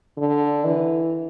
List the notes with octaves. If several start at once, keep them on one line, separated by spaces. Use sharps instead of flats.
D3
E3